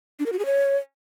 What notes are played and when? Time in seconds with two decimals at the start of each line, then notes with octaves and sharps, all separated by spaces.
0.19 D4
0.26 A#4
0.32 F#4
0.39 G#4
0.46 C#5